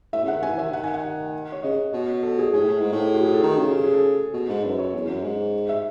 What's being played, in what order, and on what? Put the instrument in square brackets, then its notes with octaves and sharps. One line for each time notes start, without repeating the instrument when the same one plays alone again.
[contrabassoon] A2 [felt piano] E5
[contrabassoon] C#3
[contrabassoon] D#3 [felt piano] F#5
[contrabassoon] E3 [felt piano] G#5
[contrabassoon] D#3 [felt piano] E5
[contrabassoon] D#3 [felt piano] F#5
[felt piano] G#5
F#5
C#5
[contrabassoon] C#3 [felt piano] D#5
[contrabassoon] B2 [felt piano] C#5
[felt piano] A4
G#4
[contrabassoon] A2 [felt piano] G#4
[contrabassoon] A2
G#2
A2
[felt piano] F#4
G#4
A4
[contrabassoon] D#3
C#3
[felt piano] G#4
G#4
A4
[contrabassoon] B2
G#2
[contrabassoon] F#2 [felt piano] B4
[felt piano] C#5
[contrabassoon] E2
F#2
G#2
[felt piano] E5